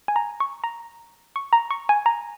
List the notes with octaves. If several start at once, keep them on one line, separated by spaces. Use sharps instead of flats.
G#5
A#5
C#6
A#5
C#6
A#5
C#6
G#5
A#5